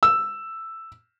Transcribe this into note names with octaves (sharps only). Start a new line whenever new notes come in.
E6